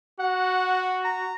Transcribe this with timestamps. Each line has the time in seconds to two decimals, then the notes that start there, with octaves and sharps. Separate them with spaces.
0.20 F#4 F#5
1.04 A#5